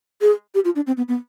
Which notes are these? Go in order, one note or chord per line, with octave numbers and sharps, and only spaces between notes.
G#4
G4
F4
D4
C4
B3
B3